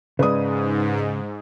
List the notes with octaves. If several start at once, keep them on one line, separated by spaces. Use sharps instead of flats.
G#2 C#3 G#3 B4 D5 D#6